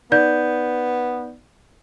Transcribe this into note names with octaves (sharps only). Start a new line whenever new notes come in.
B3 D#4 D5 G6